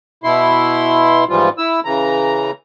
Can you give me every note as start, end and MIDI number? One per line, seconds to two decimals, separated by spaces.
0.24 1.24 47
0.24 1.24 64
0.24 1.24 84
1.29 1.49 44
1.29 1.49 52
1.29 1.49 53
1.29 1.49 55
1.29 1.49 65
1.58 1.80 64
1.58 1.80 88
1.85 2.51 49
1.85 2.51 52
1.85 2.51 82